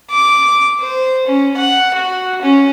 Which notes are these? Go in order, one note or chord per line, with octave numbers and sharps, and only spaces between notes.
D6
C5
C#4
F#5
F#4
C#4